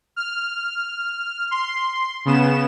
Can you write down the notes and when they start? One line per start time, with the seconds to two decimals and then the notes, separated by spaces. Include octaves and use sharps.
0.16 F6
1.51 C6
2.25 C#3 B3 E7